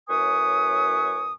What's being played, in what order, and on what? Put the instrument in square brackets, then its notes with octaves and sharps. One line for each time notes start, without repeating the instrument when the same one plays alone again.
[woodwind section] F#2 A2 B4 G#5 C#6 D#6